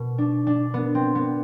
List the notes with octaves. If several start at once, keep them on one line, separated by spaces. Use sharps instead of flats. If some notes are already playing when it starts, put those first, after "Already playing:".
Already playing: B2
D4
D4
B3
C4
B3